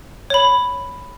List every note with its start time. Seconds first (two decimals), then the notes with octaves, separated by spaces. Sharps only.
0.30 C#5 B5